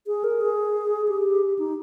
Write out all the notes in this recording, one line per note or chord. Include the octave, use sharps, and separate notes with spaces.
G#4
A#4
G#4
G4
D#4